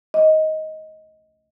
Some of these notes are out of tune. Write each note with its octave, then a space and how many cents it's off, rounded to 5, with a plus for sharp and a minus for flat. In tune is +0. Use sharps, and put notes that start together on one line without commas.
D#5 +15